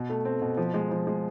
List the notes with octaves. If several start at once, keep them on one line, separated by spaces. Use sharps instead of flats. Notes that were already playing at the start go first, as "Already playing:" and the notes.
Already playing: B2
A3
C4
B2
F3
G#3
F3
G#3